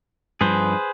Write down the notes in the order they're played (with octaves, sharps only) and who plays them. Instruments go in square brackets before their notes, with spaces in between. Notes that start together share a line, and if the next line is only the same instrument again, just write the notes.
[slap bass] G2 F3 [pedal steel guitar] G#4 B4 C5